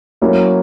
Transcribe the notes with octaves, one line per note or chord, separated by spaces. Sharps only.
F#3 A#3 C#4 E4